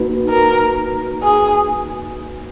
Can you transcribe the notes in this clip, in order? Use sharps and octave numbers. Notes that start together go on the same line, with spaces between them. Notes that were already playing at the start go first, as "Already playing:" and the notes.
Already playing: A#3 D#4 F#4 B4
A#4
G#4